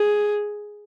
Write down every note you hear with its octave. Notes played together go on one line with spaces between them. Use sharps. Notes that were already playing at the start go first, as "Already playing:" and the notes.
Already playing: G#4